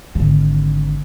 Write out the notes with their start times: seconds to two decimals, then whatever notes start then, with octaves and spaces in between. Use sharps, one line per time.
0.15 G#1 D3